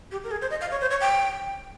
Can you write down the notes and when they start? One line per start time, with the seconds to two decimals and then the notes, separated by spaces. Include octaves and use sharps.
0.11 G4
0.24 A#4
0.31 G#4
0.42 C5
0.50 D#5
0.61 F5
0.71 C#5
0.81 C5
0.91 C#5
1.01 G5